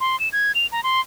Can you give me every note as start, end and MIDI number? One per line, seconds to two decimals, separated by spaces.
0.01 0.19 84
0.20 0.29 100
0.33 0.52 92
0.55 0.67 101
0.72 0.83 82
0.83 1.01 84